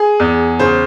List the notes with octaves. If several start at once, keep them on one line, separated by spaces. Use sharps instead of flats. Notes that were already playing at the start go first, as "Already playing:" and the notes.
Already playing: G#4
E2
C#3 C5